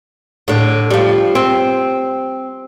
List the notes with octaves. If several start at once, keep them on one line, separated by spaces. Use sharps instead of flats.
A2 D3
F3 G3
C4